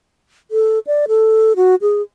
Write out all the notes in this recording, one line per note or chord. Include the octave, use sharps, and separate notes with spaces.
A4
D5
A4
F#4
G#4